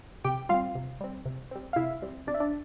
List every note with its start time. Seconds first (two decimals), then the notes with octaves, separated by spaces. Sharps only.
0.24 C3 G4 G5
0.49 G3 C4 F4 F5
0.75 C3
1.01 G3 C4
1.26 C3
1.51 G3 C4
1.73 F5
1.76 C3 E4 E5
2.02 G3 C4
2.27 C3 D4 D5
2.34 E5
2.40 D4 D5